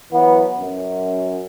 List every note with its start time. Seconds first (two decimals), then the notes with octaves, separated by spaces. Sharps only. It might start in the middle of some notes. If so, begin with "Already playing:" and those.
0.12 E3 F#3 B3
0.59 F#2